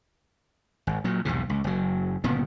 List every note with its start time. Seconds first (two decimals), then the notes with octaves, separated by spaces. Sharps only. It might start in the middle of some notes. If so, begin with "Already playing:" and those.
0.87 G#1
1.04 A#2 F#3
1.25 B1 E2 G#2 C3
1.50 C#2
1.64 F#1 F#3
2.24 G1 A#2 C#3 B3